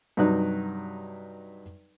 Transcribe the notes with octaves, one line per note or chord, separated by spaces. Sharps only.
G2 C3 F#3 D#4 F#6